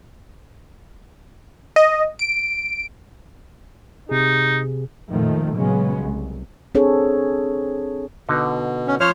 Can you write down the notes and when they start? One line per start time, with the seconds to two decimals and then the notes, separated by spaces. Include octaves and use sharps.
1.76 D#5
2.19 D7
4.09 C3 D#4 G#4
5.11 F2 A#2 D#3 F3 A3
5.55 A#2 C#3 F#3 G#3 B3 C#4
5.99 C2
6.75 C4 D4 G#4 A4 C#5
8.29 B2 D3 D#4
8.87 C#4
9.00 F3 C#4 C5 C#5 F6